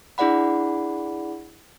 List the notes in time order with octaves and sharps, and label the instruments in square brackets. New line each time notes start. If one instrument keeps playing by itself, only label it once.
[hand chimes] D4 E4 G#4 D5 F#5 B5